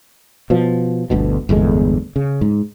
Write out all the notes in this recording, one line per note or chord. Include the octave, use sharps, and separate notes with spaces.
B2 F3
G1 D2 B2
G1 E2 A2 G#3
C#3
G#2